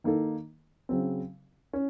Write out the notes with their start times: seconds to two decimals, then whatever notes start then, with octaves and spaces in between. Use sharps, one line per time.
0.04 D#3 A#3 D#4 A4
0.89 C#3 F#3 C4
1.73 C#4